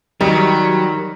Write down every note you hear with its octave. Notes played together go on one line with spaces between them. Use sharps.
D#3 F#3 G3